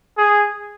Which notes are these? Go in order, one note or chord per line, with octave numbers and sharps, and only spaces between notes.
G#4